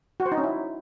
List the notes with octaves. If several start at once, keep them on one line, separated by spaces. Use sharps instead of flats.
F#4
C5
D#4
C#4
E4